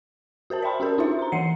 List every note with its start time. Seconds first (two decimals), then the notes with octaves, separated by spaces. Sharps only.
0.50 F#4 A#4 C5 A5
0.62 D5 E5 G5 B5 C6
0.80 C#4 F#4 G4 A#4
0.98 D4 D#4 F4 F#4 C5 E5
1.19 A#5 C6
1.32 E3 F#5 C7 C#7